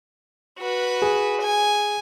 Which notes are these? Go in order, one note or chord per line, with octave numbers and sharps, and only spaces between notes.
F#4 B4
G#4
G#5